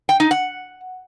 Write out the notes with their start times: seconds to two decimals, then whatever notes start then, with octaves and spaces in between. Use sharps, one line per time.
0.09 G5
0.20 D#4
0.31 F#5